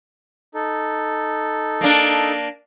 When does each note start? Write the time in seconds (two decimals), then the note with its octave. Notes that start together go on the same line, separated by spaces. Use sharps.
0.54 D#4 A4
1.81 A#3 D4